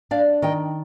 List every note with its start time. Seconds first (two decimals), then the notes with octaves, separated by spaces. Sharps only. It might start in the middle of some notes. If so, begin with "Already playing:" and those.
0.11 D4 D5 F5
0.42 D#3 D#5 G5